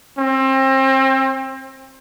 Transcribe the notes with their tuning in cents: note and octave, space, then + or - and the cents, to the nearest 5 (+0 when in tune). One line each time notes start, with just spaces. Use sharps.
C4 +30